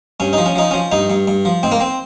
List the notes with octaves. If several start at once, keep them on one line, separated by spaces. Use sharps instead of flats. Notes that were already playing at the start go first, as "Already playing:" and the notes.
G2 C#4
F3 D#4
C#4
F3 D#4
C#4
F3
G2 D#4
G2
G2
F3
G#2 C4
A#3
C4